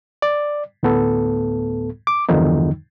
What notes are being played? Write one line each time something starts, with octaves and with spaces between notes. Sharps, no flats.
D5
D2 A2 B3 A4
D6
E2 G2 D3 D#3 F3 D#4